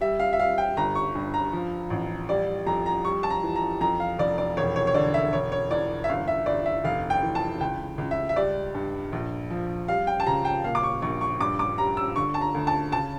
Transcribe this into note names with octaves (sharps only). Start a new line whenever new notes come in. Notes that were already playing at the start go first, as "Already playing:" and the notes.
G3 E5
F5
E5
G3 F5
G5
G1 A#5
C#6
G2
A#5
F3
A1
G3 D5
F2 A#5
A#5
G3 C#6
A5
A#5
E3
A#5
F2 A#5
F5
F1 D5
D5
E1 C#5
C#5
C#5
D3 D5
E5
E1 C#5
C#5
E2 D5
E5
G1 F5
E5
G1 D5
E5
F1 F5
G5
E3
A5
C#2 G5
C#2
E5
E5
G3 D5
G2
A#1
F3
G3 F5
G5
A5
C#3 A#5
G5
A#2 F5
D6
C#6
A#1 C#6
C#6
G2 D6
D6
G3 A#5
E6
D3 C#6
A5
A#5
D2
A5
C#3 A5